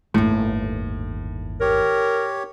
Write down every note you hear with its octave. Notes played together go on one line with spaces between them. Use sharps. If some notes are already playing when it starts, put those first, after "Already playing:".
G1 D#2 A2
G4 A#4 C#5